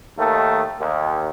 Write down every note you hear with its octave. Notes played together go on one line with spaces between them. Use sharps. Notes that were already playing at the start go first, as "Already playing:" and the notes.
D#2 D#3 A3
D#2